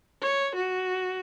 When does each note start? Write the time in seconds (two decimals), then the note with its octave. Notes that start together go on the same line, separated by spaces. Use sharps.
0.22 C#5
0.55 F#4